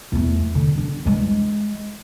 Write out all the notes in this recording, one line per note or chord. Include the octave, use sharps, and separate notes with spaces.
E2 A3
D3
D4
E3 G#3